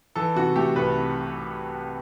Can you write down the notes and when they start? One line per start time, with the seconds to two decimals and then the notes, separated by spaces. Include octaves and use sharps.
0.16 E3 A4
0.36 C3 F#4
0.56 A3 G4
0.76 C2 B4
0.96 C3